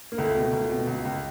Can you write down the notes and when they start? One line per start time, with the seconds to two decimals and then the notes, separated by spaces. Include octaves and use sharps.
0.12 A#3
0.18 C#2 A3
0.36 B2
0.53 C#2
0.70 B2
0.87 C#2
1.05 C#2